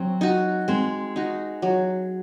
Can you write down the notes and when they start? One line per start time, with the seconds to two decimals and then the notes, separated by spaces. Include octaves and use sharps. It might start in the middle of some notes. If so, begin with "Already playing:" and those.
Already playing: F#3 C4
0.21 D#4 F#4
0.68 G#3 C4
1.16 D#4 F#4
1.62 F#3